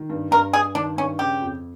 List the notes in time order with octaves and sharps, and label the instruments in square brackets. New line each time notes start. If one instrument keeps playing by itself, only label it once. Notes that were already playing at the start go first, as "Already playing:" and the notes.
Already playing: [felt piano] D#3
G2
[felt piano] G2 [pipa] A#4
[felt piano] G2 [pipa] G#4
[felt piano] D#3 [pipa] D4
[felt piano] G2 [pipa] C#4
[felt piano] C#3 [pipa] G4
[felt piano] F2